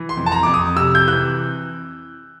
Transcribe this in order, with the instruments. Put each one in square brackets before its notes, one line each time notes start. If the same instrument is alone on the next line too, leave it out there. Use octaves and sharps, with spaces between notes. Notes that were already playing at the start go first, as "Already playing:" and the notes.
Already playing: [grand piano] E3
C6
F2
A5
A#5
F2 D6
D#6
C3 E6
G6
E3 F#6